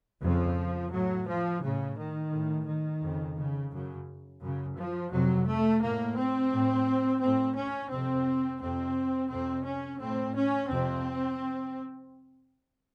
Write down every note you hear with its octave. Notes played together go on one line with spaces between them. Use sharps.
F2 C#3 F3
A2 F#3
F3
A2 C#3
D#3
A2
D#3
F2 C#3
C#3
F#2 C#3
F#2 C#3
F3
F2 C3 F#3
A3
A2 A#3
C4
A2
A2 C4
C#4
F2 C3 C4
F2 C3 C4
F2 C3 C4
C#4
A2 C4
C#4
F2 C3 C4